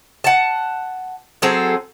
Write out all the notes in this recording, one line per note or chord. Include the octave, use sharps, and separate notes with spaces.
F#5 A5
F#3 C4 G#4 A4